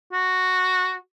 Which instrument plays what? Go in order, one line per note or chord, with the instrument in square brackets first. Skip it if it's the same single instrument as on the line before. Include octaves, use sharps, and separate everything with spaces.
[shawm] F#4